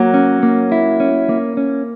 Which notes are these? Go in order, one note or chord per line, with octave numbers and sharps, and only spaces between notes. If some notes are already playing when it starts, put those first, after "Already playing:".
Already playing: F#3 A#3
C#4
A#3
E4
C#4
A#3
C#4